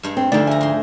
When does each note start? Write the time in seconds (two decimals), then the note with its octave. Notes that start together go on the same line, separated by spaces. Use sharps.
0.03 G2 G#3
0.17 C4
0.32 D2 D3 F3 D#4 D5 A6
0.47 G#4 E5 G#5 A#5
0.61 G#2 C6